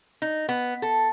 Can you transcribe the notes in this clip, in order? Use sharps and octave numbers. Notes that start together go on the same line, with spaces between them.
D#4
B3
A4